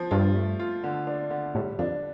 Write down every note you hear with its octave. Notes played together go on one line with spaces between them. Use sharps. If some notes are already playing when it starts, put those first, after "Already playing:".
Already playing: F3
G2 F4
A3
F4
D3
D4
D3
A2 G3
F2 D4